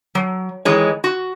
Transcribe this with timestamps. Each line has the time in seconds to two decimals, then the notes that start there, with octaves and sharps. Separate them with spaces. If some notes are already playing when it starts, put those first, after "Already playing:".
0.15 F#3
0.65 D#3 E3 G#3 C#5
1.04 F#4